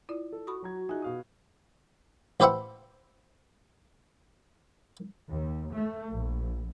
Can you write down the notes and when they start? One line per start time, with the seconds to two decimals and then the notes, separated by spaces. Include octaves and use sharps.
0.09 E4 F4 D5
0.32 A4
0.47 F#4 B5 C#6 D#6
0.62 F#3 A#5 G#6
0.89 D#4 F4 G#4 E5 G#5
1.02 B2 F5 D#6
2.40 A1 G4 B4 C5 E5 F#5
5.29 D#2
5.72 A3
6.10 A#1